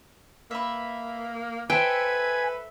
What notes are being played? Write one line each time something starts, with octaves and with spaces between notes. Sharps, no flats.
A#3 B4 E5
A4 B4 C5 E5 G5 G#5